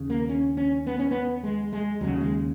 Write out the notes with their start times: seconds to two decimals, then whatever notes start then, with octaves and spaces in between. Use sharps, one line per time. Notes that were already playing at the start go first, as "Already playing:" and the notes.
Already playing: D#2 C#3
0.10 A#3
0.29 C#4
0.57 C#4
0.87 B3
0.99 C#4
1.11 B3
1.43 G#3
1.73 G#3
2.01 D#2 C#3 F#3
2.20 G#3